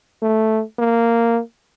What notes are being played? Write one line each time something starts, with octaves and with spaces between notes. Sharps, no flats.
A3
A#3